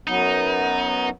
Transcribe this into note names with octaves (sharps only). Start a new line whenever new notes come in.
F#2 F#3 B3 D#4